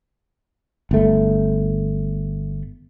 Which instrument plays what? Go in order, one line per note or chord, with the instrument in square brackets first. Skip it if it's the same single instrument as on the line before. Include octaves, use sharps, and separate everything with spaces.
[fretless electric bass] G1 A3